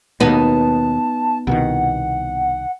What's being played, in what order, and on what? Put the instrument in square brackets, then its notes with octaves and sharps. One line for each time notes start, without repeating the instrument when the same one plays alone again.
[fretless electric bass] D#2 B2 [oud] B3 D#4 [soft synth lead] A5
[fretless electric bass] C2 B2 D#3 [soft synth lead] F#5